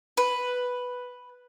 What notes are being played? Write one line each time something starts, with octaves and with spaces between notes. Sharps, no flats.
B4